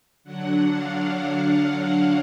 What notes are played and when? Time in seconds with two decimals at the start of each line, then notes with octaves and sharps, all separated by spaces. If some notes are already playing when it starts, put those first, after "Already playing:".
0.24 D3 F#3 D4 F#5
0.71 F5